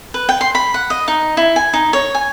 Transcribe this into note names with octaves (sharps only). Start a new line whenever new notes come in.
B4
G5
C6
B5
F#5
D#5
D#4
E4
G#5
D#4
C#5
G#5